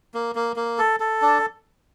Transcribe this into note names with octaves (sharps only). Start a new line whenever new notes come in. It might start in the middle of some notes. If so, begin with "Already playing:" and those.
A#3
A#3
A#3
A4
A4
D4